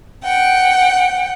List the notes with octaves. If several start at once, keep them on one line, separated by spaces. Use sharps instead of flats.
F#5 G5